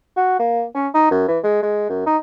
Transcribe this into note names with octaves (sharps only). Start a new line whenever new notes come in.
F#4
A#3
C#4
D#4
F#2
E3
G#3
G#3
F#2
D#4